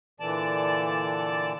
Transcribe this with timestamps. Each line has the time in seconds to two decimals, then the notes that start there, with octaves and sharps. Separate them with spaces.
0.20 A#2 D3 E3 D5 A5